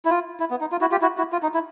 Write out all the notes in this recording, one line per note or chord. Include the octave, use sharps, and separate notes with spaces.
E4
F4
E4
B3
D#4
F4
E4 F#4
F4 G4
E4 F#4
E4 F#4
F4
D#4
E4